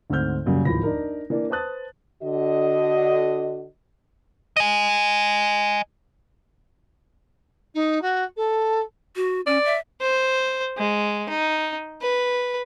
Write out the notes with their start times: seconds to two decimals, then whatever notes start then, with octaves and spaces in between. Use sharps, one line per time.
0.10 D2 G#2 A3 C4 F6 G6
0.46 F#2 A#2 C#3 F#3 G3
0.65 D1 D#2 E3 F3 B5 A#6
0.83 D4 D#4 A#4
1.30 E3 A#3 D4 D5
1.50 B4 C5 A5 D#6 F#6 A6
2.22 D3 F#4 D#5
4.57 D#5 G#5
7.75 D#4
8.02 F#4
8.37 A4
9.16 F#4
9.47 C#4 D5
9.65 E5
10.01 C5
10.78 G#3
11.29 D#4
12.02 B4